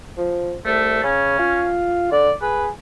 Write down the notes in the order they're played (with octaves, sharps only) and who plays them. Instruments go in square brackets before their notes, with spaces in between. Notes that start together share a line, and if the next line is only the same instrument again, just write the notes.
[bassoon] F3
[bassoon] C2 [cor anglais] A3
[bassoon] C#3 [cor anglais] C#4
[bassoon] F4
[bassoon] D3 [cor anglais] D5
[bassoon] G#4 [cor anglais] B4